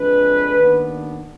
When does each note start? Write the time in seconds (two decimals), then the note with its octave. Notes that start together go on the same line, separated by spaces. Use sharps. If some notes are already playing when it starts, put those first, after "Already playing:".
Already playing: F2 D3 G#3 D4 B4
0.59 D#2 D#3 B3 D4